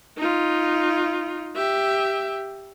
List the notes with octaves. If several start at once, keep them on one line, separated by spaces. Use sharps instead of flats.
D#4 F4
G4 E5